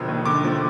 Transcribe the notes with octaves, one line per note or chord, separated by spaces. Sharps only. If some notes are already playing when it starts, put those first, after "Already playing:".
Already playing: E1 D3 F3
D#2
D3 D6
F3